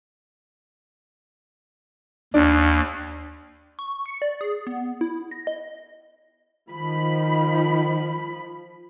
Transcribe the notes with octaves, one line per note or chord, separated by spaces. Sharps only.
D#2 D4
C#6
C#7
D5
G#4
B3
E4
A#6
D#5
D#3 F3 B5